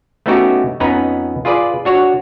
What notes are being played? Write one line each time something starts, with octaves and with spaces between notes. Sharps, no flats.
A3 B3 C#4 D#4 F#4 G4
F2 B3 C#4 D#4 B4 A#5
F4 G#4 B4 D5
D4 F#4 C#5